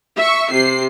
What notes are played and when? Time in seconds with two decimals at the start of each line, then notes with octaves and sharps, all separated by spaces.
0.17 E5 C#6
0.52 C3 C7